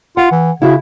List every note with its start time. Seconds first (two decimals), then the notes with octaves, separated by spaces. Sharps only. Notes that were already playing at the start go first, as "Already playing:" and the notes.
0.17 F4 F#5
0.32 E3
0.62 C#3 E4 F#4 E5